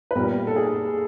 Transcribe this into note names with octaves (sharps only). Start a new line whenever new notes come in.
B4
A#2 G3 B3 A#4
A4
G#4